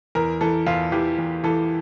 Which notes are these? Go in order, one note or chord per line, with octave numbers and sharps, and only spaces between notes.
E2 A#4
E3 A4
E2 F4
E3 G4
E2
E3 A4